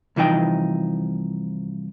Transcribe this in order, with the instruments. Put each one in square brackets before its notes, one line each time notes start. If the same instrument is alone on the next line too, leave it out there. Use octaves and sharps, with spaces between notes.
[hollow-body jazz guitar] C2 E3 F3 D#4 G5